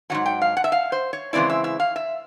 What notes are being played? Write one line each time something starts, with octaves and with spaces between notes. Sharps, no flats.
G#2 D#3 F#3 F#5
G5
F5
F#5
E5
F5
C5
C#5
C#3 E3 G#3 C4 E4 D5
E5
E5
F5
E5